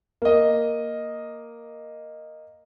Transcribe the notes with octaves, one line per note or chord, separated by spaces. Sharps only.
A#3 D#5